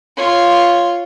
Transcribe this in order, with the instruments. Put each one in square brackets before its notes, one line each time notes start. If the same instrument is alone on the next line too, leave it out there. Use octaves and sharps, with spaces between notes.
[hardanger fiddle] F4 C#5